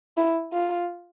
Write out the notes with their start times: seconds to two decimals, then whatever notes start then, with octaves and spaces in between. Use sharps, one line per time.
0.17 E4
0.53 F4